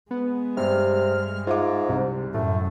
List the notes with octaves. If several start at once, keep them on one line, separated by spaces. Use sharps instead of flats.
G#3 B3
G2 C3 F6
G#2 F4 E5 D6
C2 C3
F#2 A2 A3